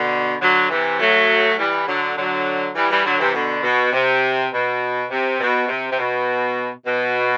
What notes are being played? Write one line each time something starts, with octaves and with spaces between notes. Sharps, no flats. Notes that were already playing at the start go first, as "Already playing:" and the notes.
Already playing: B2 D3
D3 F#3
C3 E3
F#3 A3
E3 G3
D3 F#3
D3 F#3
E3 G3
E3 G3
D3 F#3
C3 E3
B2 D3
B2
C3
B2
C3
B2
C3
C3
B2
B2